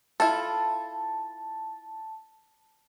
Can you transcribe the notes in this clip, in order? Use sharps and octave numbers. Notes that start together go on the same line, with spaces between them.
E4 F4 A4 A5